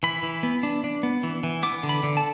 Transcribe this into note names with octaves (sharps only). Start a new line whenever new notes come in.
E3 B5
E3
B3
D4
D4
B3
E3
E3
B3 D6
D3
B5
D3
A5